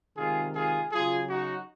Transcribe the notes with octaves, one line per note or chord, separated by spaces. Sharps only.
C3 D#3 G#3 F4 G#4
F4 G#4
C#3 F#3 F4 G#4
D#4 F#4